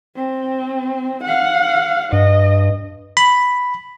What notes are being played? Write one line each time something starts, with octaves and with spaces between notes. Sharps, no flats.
C4
F5 F#5
G2 D#5
B5